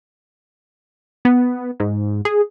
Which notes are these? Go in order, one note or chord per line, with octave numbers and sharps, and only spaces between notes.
B3
G#2
G#4